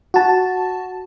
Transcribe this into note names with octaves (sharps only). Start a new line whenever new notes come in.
F#4 A5